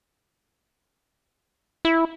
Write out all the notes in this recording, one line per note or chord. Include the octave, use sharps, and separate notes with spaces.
E4